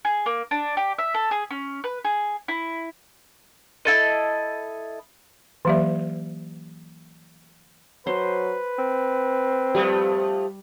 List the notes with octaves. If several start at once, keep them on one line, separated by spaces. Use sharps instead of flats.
G#4
A#3
D4
G4
E5
A4
G#4
C#4
B4
G#4
E4
E4 A4 D#5
E3 F#3 A#3 G4 D5 E5
F#3 B4 C5
C4
F3 G3 A3 G4